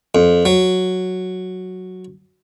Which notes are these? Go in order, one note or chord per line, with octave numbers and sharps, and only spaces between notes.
F2
F#3